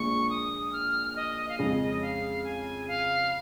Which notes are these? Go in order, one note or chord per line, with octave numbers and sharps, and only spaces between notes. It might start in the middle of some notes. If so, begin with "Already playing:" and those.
Already playing: A#1 A#2 G#3 C#6
D#6
F6
D#5
F5
F2 C#3 G#3 D#5
F5
G#5
F5